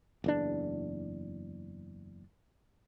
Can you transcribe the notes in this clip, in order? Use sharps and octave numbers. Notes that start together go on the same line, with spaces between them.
F#1 E2 D4